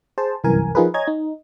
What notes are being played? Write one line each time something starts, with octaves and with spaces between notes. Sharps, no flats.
G#4 C5 A5
G1 C2 F#2 E3 A#4 G#5
F3 D#4 F4 G#4 A#4 B4
C#5 D#5 G#5 A#5 G#6
D#4